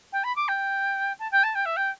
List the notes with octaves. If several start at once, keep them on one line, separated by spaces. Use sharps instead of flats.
G5
B5
D6
G5
A5
G5
A5
G5
E5
G5